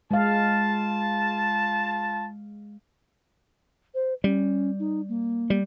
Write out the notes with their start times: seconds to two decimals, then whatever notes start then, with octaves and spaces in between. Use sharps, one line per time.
0.11 G#3 F4 F5 A5
3.94 C5
4.24 G3 C#4
4.79 D#4
5.09 A#3
5.50 G3